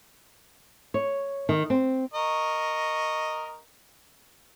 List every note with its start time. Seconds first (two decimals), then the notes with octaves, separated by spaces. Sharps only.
0.94 C#5
1.49 D#3
1.70 C4
2.14 A#4 D#5 C#6